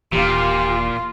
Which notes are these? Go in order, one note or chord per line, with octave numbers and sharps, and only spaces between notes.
D#1 A#2 E3 F4 G4